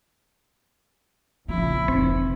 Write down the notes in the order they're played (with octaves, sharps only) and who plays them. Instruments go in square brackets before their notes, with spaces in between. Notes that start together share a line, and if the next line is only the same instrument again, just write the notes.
[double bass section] A#1 C#3 F3 [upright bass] C4 [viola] E4
[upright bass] F1 [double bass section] E3 [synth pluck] C4